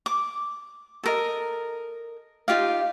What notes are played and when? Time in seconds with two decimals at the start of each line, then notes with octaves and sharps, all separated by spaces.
0.06 D6
1.03 A4 A#4 D#5
2.48 D#4 F4 G4 F5